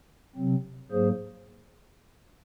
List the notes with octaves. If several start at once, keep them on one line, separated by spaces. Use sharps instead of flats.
C3 F#3 C4
G#2 F#3 A#3 G#4 C5